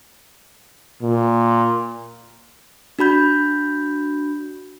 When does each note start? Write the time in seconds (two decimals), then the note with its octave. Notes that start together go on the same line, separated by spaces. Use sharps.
1.02 A#2
2.99 D4 F#4 B5 G6